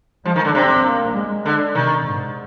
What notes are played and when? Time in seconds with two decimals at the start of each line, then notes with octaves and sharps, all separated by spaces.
0.25 F3 G#3
0.36 D#3
0.45 D3
0.55 C3 C4
0.84 A#3
1.15 G#3
1.46 D3
1.75 C3 D#3
2.05 G#2